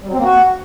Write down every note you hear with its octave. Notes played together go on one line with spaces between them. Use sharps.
G3
F#3
C4
A#3
F#4